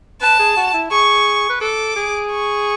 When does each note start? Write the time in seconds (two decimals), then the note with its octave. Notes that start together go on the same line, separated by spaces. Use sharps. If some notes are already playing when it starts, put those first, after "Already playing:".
0.21 B4 A5
0.39 G#4
0.56 F#4
0.74 E4
0.91 G#4 C#6
1.49 B4
1.61 A4 D6
1.96 G#4
2.32 C#6